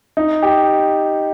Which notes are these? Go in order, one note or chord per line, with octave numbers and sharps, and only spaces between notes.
D#4
G4